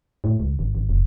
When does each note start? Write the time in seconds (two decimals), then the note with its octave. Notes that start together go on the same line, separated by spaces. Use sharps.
0.24 A2
0.40 C#2
0.59 G#1
0.75 G#1
0.89 F1